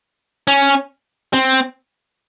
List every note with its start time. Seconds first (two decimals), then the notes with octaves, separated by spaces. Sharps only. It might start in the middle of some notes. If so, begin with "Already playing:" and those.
0.47 C#4
1.33 C4